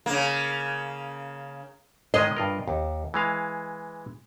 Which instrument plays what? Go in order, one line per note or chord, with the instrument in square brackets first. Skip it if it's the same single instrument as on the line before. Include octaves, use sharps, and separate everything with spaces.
[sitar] C#3 A#3
[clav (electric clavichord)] D#3 G#3 G#4 [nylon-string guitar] D#5
[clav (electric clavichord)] G2 F4 A#4
D#2
E3 G#3 F5